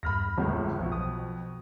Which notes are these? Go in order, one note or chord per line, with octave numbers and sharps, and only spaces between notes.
E2 G2 B5 F6 A#6
G1 C#2 A2 E3
B1 F2 B2
D#6